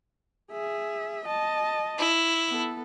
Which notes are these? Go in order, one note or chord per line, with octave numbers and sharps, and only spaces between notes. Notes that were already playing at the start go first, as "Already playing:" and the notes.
G#4 E5
D#5 A5
E4
B3 A4